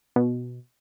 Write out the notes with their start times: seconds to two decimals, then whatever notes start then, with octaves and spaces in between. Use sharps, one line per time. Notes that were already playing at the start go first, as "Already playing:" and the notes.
0.16 B2